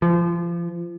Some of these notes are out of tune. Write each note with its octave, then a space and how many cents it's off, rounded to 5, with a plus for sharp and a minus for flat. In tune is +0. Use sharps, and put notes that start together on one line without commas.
F3 -30